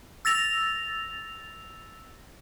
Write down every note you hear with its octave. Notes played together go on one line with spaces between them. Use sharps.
E6 A6 A#6 F7